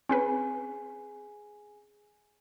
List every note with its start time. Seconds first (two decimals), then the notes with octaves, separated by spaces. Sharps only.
0.09 C4 C#4 G#4 B4 G#5